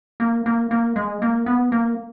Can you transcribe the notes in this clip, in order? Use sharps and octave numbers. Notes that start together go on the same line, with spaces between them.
A#3
A#3
A#3
G#3
A#3
B3
A#3